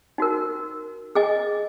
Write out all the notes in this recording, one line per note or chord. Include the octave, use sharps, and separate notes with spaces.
D#4 F#4 A#4
G#4 D#5 G#5